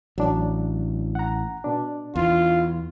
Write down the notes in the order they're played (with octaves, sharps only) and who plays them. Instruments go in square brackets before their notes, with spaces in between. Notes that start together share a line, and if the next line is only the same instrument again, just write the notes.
[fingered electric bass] A1 [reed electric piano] F#3 D4
[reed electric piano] F#5 A#5
B2 D4
[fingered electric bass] E2 [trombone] F4